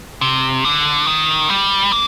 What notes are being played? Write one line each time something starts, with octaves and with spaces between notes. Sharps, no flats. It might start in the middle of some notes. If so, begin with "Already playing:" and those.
C3
D3
D#3
G3
A#3